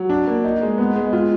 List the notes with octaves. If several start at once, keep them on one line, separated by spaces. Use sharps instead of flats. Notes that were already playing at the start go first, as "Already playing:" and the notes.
Already playing: F#3
D4
A#3
D#4
G#3
B3
G#3
F4